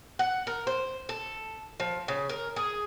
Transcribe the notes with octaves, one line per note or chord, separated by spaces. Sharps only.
F#5
A#4
C5
A4
F3
C#3
A#4
G#4